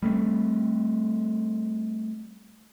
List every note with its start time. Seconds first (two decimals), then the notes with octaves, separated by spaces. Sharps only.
0.02 G3 A3 A#3 C4